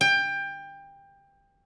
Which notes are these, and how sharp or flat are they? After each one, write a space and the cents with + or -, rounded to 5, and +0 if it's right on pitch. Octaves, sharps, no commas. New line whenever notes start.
G5 +20